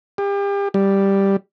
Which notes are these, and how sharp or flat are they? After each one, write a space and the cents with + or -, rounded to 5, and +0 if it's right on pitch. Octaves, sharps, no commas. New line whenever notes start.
G4 +35
G3 +0